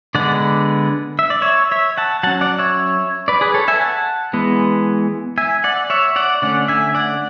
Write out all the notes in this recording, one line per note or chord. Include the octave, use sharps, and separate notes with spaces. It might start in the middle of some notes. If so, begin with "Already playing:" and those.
D3 G#3 B3 D5 F#5
E5
D5
C#5 E5
C#5 E5
F#5 A5
F#3 C#4 F#5 A5
D5 F#5
C#5 E5
B4 D5
G#4 B4
A4 C#5
E5 G#5
F#5 A5
E3 G#3 B3
E5 G#5
D5 F#5
C#5 E5
D5 F#5
D3 A3 C#4 D5 F#5
E5 G#5
D5 F#5